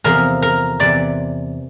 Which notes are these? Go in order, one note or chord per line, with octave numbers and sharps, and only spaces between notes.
E2 C3 F3 A#4
A#4
E2 C3 E3 D5